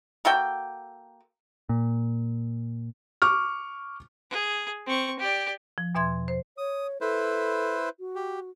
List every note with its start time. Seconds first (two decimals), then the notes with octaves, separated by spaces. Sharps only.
0.25 A#3 F#4 A4 G5
1.69 A#2
3.22 C#6 D6 F6
4.30 G#4
4.87 C4 C#6
5.19 G4 D5
5.78 F3
5.95 E2 B2 E5 C6 G#6
6.28 C5
6.58 C#5 D#6
7.01 E4 A4 B4 C5
8.00 F#4
8.15 G4